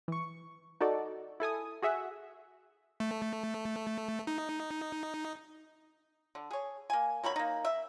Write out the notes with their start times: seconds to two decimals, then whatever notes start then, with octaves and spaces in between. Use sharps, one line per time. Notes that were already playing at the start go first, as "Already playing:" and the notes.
0.08 E3 C#6
0.80 D#4 F#4 A4 D5
1.40 E4 A4 G#5 D#6
1.82 F#4 G#4 E5 F#5
3.00 A3
4.27 D#4
6.35 D3
6.51 G#4 C#5
6.90 A#3 G#5
7.24 B2 D#3 C#5 B5
7.36 A#3 D#4
7.65 E5